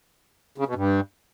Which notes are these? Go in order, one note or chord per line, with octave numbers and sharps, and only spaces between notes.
C#3
B2
G2